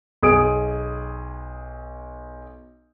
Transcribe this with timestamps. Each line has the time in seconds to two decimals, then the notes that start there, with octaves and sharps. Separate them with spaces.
0.22 B1 G#4 D#6 D7